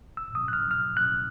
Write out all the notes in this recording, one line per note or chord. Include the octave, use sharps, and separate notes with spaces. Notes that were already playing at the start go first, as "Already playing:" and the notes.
E6
D#6
F#6
F6
F6
F#6